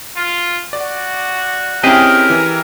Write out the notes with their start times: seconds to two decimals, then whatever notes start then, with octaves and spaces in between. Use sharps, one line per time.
0.16 F4
0.73 F#4 D5
1.84 C4 C#4 E4 G4 G#4 A#4 D#5
2.30 E3